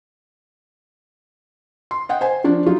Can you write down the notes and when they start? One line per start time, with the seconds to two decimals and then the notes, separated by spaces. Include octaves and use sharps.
1.91 C6
2.09 D#5 F#5 G5
2.21 C5 G#5
2.44 F3 D4
2.66 F#3 D#4 F4